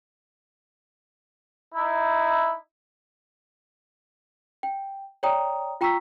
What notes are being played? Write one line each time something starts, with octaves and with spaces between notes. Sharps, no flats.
D#4 E4
G5
C#5 D5 G5 A#5 D#6
F4 G5 A#5 C#6 E6 B6